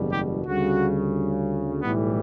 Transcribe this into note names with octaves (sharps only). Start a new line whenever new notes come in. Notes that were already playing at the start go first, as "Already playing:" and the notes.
Already playing: F#1 E2 B2 G3
G4
D2 C#3 G3 F#4
B1 A2 E3 G3 B3